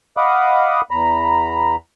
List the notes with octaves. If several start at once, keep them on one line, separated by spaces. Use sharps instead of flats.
D#5 F5 F#5 B5 D6 D#6
E2 A#5 B5